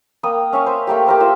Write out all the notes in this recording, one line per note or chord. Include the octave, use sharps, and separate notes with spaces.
A#3 G5 D#6
C#4 E5 F5 C#6
C5
A3 A#3 G4
G4 A#4 C5
F4 C5 E6